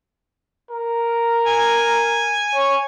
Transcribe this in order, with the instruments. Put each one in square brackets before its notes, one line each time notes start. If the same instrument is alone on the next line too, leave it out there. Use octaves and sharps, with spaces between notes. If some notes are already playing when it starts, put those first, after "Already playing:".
[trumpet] A#4
[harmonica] G#5
[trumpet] C#5